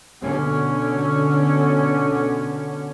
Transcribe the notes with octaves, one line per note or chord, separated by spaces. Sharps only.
B2 D3 C#4